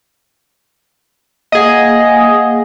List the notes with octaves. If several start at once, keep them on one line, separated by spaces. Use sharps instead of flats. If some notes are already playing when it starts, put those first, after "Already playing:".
A#3 G#4 D#5 F5 F#5